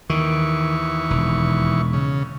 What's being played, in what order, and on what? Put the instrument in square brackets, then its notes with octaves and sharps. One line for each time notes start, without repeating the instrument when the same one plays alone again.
[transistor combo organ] D#2 E3 C#6 [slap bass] D#3
[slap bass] E1
[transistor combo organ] C#3